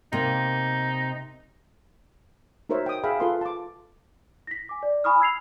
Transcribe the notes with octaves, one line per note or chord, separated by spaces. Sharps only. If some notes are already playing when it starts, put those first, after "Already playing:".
C3 A#3 D#4
D#4 F#4 A#4 C5 C#5 E5
G5 D#6
G#4 E5 F5 G5 B5
F4 A4 B4 F5 C6 D#6
A5 D6
A#6 B6
G#5 D6
D5
G#5 B5 C#6 D#6 F6
E6 G#6 C7 F7